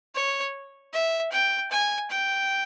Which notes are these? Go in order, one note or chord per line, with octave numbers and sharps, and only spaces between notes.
C#5
E5
G5
G#5
G5